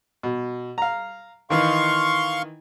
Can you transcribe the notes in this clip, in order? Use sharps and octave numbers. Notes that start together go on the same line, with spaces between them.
B2
F5 A#5
D#3 E3 D#4 F5 C6 C#6